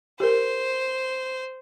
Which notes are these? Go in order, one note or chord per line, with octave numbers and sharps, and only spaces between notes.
G4 A#4 C5